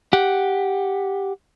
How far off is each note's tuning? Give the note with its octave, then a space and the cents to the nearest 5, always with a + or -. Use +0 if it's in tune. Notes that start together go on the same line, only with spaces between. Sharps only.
G4 +0 F#5 +0